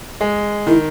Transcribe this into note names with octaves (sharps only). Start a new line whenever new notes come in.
G#3
D#3 E4